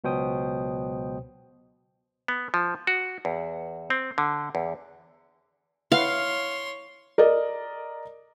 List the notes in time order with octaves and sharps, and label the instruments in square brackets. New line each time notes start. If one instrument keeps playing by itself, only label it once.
[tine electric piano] C#2 B2 F#3 C5 G5 D#6
[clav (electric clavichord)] B3
F3
F#4
E2
C4
D3
E2
[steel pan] E4 B4 F#5 [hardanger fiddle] C#5 C6 [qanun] F5
[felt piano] A#4 D5 D#5